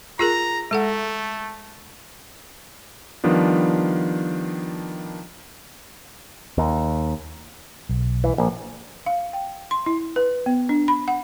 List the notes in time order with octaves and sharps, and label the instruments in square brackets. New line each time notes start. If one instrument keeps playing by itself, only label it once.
[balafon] F4 G#4 A#4 [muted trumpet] A#5
[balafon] G#3 A4 F#5 [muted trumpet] A3
[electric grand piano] D#3 F3 G3 B3 D4
[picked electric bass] D#2
[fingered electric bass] B1
[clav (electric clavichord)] E3
A#1
[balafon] F5
G5
C6
E4
B4
B3
D4
B5
F#5